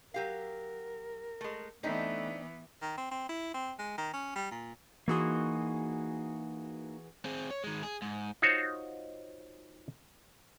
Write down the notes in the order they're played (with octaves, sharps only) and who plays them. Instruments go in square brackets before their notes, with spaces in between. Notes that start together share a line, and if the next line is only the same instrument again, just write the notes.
[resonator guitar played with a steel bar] F#3 G4 F5 [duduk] A#4
[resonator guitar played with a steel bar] G#3 A3
[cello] E3 B3 [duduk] A3 [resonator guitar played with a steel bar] C4 D4 D#4
[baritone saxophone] D#3
C4
C4
E4
C4
G#3
D#3
C#4
G3
A#2
[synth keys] E3 F#4 G#4 [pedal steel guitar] A#3 D#4 C6
[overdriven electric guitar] C4 G#4
C#5
D#3 G#3
G#4
G#2
[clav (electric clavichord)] D#4 F4 F#4 C5 C#5